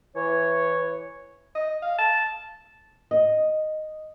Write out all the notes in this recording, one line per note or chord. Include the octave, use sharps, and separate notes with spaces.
E3 C#5
D#5
F5
A5
D#5